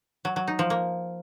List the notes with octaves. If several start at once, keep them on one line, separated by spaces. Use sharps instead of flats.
F#3
F#3
D#4
F3
A#3